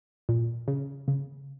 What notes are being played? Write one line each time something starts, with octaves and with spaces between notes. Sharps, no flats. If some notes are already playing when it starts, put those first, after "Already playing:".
A#2
C#3
C#3